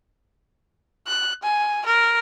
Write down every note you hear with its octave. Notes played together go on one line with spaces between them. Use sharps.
F#6
G#5
A#4